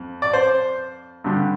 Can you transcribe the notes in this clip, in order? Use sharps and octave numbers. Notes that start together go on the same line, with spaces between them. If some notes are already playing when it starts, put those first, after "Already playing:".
Already playing: F2
D5
C5
G2 D3 G3